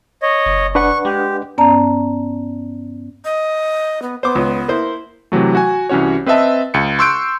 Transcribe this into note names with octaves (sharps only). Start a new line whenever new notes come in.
C#5 D#5
F#1
D4 B4 F#5 C#6
G#3 G4
G2 B3 C#4 D5 A5 A#5
D#5
B3
B3 C5 D6
C#2
A#3 E4 C5
C3 E3 F#3 A3
F#4 G#5
C2 E3 C#4 F#4 C#5
C4 B4 D#5 E5 A5
C#2 C#7
C6 C#6 E6 F#6 G6 D7